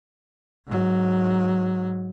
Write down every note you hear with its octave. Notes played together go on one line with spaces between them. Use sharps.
G#2 F#3